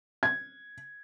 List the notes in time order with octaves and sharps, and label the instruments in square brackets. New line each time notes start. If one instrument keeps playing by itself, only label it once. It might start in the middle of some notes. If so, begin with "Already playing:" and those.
[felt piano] G#6